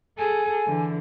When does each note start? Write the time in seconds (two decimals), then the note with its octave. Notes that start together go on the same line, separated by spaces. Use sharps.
0.18 G#4 A4 G#5
0.66 D3 E3